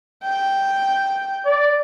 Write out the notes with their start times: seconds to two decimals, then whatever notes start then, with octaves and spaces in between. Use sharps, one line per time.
0.24 G5
1.46 D5